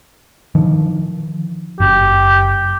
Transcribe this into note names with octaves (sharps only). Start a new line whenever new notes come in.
D#3 F3
F#1 G4